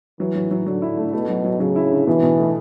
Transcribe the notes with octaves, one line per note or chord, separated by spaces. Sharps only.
E3 F#3
F#3
F#3
D3 F#3
E4
A3
B2 A3
F#3
F#3
C#3 F#3
E4
D3
B2 E3
B2
A3